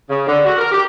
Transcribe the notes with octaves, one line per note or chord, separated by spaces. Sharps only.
C#3
D3
F#4
A#4
G4